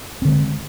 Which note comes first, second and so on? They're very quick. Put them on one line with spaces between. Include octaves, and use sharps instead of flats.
C4 D3 G#3